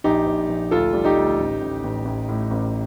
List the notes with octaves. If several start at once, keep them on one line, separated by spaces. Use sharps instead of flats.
A#1 D#4 G4
A#1
A#1
D2 F4 A4
G3
D#4 G4
D2
A1
A1
A1
A1
A2
A1